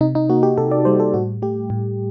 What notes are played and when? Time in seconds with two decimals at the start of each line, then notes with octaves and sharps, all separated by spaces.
0.01 C3 D#4
0.15 D#4
0.30 A#3 F#4
0.43 G4
0.58 C3 A4
0.71 D5
0.85 G3 C5
1.00 A4
1.14 A2 F#4
1.42 A3 G4
1.70 A2